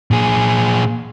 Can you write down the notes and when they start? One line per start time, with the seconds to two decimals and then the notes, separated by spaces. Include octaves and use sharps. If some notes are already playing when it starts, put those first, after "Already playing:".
0.11 A#2 G#4